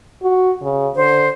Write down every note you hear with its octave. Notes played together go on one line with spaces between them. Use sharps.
F#4
C#3
D3 C5